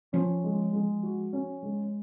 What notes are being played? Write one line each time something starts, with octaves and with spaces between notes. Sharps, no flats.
F3 C#4
G#3
G#3
F#4
C#4
G#3